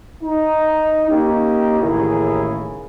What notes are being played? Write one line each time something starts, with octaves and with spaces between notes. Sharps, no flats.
D#4
A#3 C#4 D#4 G4
A1 D#2 C#3 E4 G#4 A#4